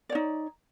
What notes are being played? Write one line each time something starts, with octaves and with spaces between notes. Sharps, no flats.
D#4 C#5 D5